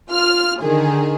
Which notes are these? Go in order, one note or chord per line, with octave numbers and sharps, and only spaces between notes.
F4 F6
D3 D#3 G#4